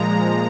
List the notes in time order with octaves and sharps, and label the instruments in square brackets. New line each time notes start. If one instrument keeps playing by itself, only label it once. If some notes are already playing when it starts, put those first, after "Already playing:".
Already playing: [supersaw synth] A#2 F3 G#3 A#5